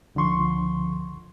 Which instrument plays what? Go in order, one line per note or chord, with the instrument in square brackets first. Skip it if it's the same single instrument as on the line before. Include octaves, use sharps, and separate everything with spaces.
[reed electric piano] C#2 D3 F3 C6 C#6